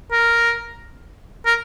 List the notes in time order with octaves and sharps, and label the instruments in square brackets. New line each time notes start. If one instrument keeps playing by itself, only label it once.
[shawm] A#4
A#4